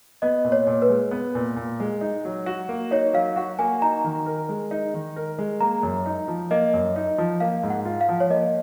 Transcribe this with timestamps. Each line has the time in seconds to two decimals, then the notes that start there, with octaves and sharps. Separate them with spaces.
0.22 B3 D#5
0.44 A#2
0.52 C#5
0.67 A#2
0.82 B4
0.89 G#3
1.11 B3
1.35 A#2
1.56 A#2
1.80 G#3
2.01 D#4
2.25 F#3
2.46 F#4
2.69 A#3
2.91 D#4 C#5
3.14 F#3 F5
3.36 F#4 F#5
3.59 A#3 G#5
3.82 D#4 A#5
4.04 D#3
4.26 A#4
4.49 G#3
4.71 D#4
4.94 D#3
5.16 A#4
5.38 G#3
5.61 A#3 A#5
5.83 F#2
6.06 D#4
6.28 F3
6.51 A#3 D#5
6.74 F#2
6.96 D#4
7.18 F3
7.40 A#3 F5
7.63 G#2
7.70 F#5
7.85 F4
8.01 F5
8.09 F3
8.20 C#5
8.30 A#3 D#5